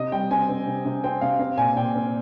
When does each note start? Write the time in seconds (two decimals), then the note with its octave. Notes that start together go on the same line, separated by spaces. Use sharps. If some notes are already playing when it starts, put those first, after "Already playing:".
Already playing: C3 D#5
0.12 G3 G5
0.31 C4 G#5
0.49 C4
0.67 C3
0.85 C3
1.04 C4 G5
1.21 C3 F5
1.39 C4 F5
1.58 A#2 G#5
1.76 A#2 G5
1.95 C4